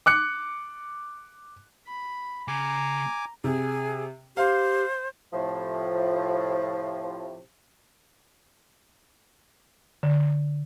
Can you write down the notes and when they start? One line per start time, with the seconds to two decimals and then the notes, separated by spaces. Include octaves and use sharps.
0.06 D6 F#6 C#7
1.87 B5
2.48 C#3 G#5 A#5 D6
3.44 C3 G#4
4.37 G4 C5 F5
5.33 A2 C3 F3
10.03 D3